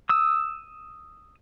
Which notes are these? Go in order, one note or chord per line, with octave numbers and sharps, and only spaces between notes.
D#6 E6